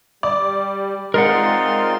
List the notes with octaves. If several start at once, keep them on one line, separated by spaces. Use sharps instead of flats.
G3 D5
G#3 C4 D#4 F4 A#4 D5 F#5 C6